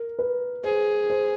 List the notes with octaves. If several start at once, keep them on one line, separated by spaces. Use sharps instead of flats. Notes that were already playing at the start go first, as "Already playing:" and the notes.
Already playing: A#4
B4
G#4 C5
C5